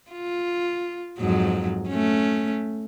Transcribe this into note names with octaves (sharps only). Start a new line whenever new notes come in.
F4
F2 G#2 F#3
A3 C#4